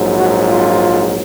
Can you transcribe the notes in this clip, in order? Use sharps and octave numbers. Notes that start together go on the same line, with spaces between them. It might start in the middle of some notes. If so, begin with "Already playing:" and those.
Already playing: A#1 G#2 F#3
F#4
F4